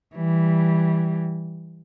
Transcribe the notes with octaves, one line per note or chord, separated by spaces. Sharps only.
E3 G3